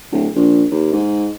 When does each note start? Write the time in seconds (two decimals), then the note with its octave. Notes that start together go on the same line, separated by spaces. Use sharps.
0.12 D1
0.35 A#1
0.71 D#2
0.92 G#2